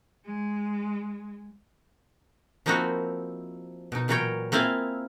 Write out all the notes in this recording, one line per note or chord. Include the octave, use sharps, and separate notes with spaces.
G#3
F3 A#3 C4 D#4 E4 F#4
B2 D#4
A#2 E3 F#3 A#4 C#5 G5
A#3 C4 E4 F4 F5 G#5